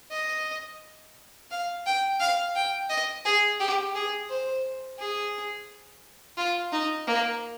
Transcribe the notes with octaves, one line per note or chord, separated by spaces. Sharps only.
D#5
F5
G5
F5
G5
D#5
G#4
G4
G#4
C5
G#4
F4
D#4
A#3